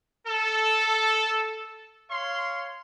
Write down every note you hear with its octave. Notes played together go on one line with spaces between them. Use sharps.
A4
C#5 F5 C6